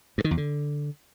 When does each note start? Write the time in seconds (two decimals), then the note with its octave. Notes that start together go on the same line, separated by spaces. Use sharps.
0.18 G2
0.24 D#3
0.31 E2
0.37 D3